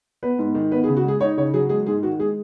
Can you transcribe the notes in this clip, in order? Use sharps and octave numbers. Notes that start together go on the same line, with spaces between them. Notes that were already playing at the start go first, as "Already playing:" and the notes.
B3 B4
G#2
D#3
B3 B4
G#4
C#3
F#4
G#3 G#4
D#4 C#5
C#3 C#5
F#3 G#4
G#3 G#4
G#2 G#4
D#3 F#4
G#3 G#4